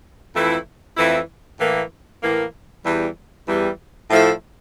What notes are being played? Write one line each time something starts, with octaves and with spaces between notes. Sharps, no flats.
F2 E3 A3 E4
F2 E3 A3 E4
A2 E3 A#3
A2 E3 A#3
E2 E3 G3
E2 E3 G3
A2 F3 A3 E4 A4